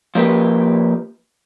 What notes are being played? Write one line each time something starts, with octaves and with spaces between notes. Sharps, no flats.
F3 A#3 G4 B4